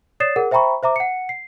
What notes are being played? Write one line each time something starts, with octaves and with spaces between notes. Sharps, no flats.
C#5 D5 D#6 A6 C7 E7
G#4 A#4 F#5
C5 E5 G5 A#5 B5 C#6
C5 E5 A#5 D6
F#5 C#7
C7